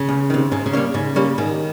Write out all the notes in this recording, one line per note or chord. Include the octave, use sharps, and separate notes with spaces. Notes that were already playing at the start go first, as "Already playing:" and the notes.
Already playing: C#3
C#2
C3 D#3
G#2 C#3
C#3
G3 A#3 C#4
G#2 C#3
G3 A#3 C#4
G#2 D#3